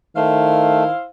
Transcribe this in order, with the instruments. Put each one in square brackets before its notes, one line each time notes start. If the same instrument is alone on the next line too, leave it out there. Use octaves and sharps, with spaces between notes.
[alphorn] D#3 [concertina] A3 [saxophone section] E4 C5 F5